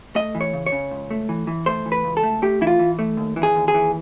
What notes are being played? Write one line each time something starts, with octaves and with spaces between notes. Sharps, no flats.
A3 D#5
E3
C#5
C#3
C#5
C#3
C#2
A3
E3
E3
A3 C5
E3
B4
C#2
A4
A3
A3 G4
E3 E4
F4
E3
A3
D#2
E3
G#4
D#2
G#4
E3